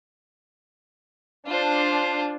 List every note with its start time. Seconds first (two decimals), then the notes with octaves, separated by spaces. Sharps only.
1.47 D4 F4 C5